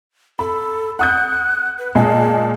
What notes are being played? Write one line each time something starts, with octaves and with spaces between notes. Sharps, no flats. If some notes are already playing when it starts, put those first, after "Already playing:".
A4 B5
F#5 D#6 F#6 G6
B4
A#2 G#3 G#4 A5